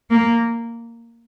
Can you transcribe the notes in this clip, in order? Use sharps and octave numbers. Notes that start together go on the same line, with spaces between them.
A#3